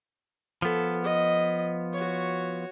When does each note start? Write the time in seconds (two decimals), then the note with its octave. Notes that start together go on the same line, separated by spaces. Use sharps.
0.62 F3 B3 A4
1.05 D#5
1.93 F#4 C#5